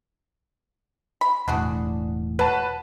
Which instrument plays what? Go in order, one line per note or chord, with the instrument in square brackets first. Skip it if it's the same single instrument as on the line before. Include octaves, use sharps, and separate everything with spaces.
[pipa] B5
[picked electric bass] E1 A2 [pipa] D4 F#4 G#4
[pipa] F#3 [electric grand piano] B4 A5